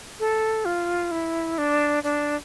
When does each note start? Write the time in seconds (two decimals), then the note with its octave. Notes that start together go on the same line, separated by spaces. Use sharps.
0.20 A4
0.65 F4
1.11 E4
1.58 D4
2.04 D4